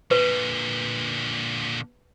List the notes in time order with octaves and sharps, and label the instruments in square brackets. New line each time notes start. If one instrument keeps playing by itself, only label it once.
[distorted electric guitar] A#2 D3 [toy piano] B4